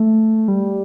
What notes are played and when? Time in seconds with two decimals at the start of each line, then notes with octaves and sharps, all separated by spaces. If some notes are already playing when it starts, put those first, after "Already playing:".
Already playing: A3
0.48 G3